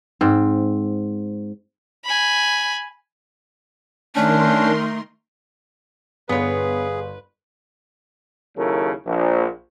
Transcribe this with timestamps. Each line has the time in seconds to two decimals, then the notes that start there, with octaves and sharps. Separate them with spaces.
0.21 G#2 C4
2.05 G#5 B5
4.15 D#3 A3 C#4 D4 A#4 C6
6.29 G1 B3 G#4 B4 C#5
8.57 D#2 C#3 F#3 E4 A4 A#4
9.06 A#1